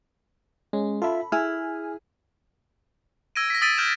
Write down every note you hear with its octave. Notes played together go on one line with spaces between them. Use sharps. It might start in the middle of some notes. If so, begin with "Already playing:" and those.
G#3 C#4
F4 A4 E5 B5
E4 G#4 G#5 F6
E6 G#6 A#6 D7 D#7
A#6 B6
D#6 E6 A6 B6 D7 D#7
E6 F6 G6 D7 E7